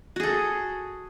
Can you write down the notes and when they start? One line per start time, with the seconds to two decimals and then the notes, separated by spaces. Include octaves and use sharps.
0.16 F#4
0.20 G#4
0.23 A4